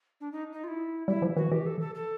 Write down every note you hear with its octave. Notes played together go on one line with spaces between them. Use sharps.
D4
D#4
D#4
F4
E4
G3 E4
F3
E3 F#4
E3 G4
A4
A4
A4